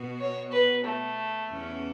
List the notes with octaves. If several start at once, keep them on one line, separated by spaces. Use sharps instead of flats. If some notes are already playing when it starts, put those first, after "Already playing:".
Already playing: B2 B3 F#4
C#5
B4
A3
E2 C#3 E3 C#4